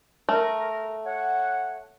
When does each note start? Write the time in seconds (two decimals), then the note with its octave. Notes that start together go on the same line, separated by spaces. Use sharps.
0.29 A3 A#4
1.06 C#5 F#5